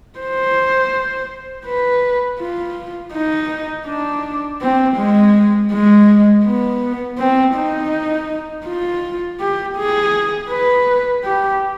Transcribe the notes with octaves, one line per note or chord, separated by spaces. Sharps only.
C5
B4
F4
D#4
D4
C4
G#3
G#3
B3
C4
D#4
F4
G4
G#4
B4
G4